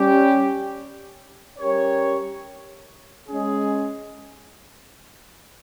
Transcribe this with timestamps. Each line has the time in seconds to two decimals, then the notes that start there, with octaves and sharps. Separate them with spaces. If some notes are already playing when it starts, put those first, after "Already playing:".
Already playing: G3 C#4 G4
1.59 G3 C#4 G4 A#4 C#5
3.28 G#3 C#4 G#4